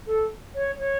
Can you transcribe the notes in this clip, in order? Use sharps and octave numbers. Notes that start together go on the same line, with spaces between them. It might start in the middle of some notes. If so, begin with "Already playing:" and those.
A4
C#5
C#5